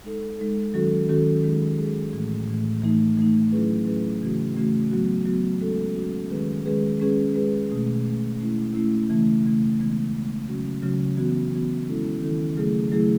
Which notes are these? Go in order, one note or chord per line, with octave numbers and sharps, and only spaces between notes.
G#3 D#4 A4
G#3 D#4 A4
D#3 F#3 C#4 F#4 A4
D#3 F#3 C#4 F#4 A4
D#3 G#3 D#4 G#4
D#3 G#3 D#4 G#4
A2 E3 A3
A2 E3 A3
E3 A3 D#4
E3 A3 D#4
F#3 C#4 E4 G#4 B4
F#3 C#4 E4 G#4 B4
C#3 E3 A3 C#4 F#4
C#3 E3 A3 C#4 F#4
F#3 B3 F#4
F#3 B3 F#4
G#3 C#4 F#4 A4
G#3 C#4 F#4 A4
D#3 G#3 C#4 G#4 B4
D#3 G#3 C#4 G#4 B4
G#3 C#4 G#4 B4
G#3 C#4 G#4 B4
B2 A3 C#4
B2 A3 C#4
A3 C#4 E4
A3 C#4 E4
C#3 E3 A3
C#3 E3 A3
C#3 E3 G#3 B3
C#3 E3 G#3 B3
C#3 F#3 C#4 F#4
C#3 F#3 C#4 F#4
E3 B3 F#4
E3 B3 F#4
D#3 G#3 C#4 E4 A4
D#3 G#3 C#4 E4 A4
C#3 F#3 A3 E4 G#4
C#3 F#3 A3 E4 G#4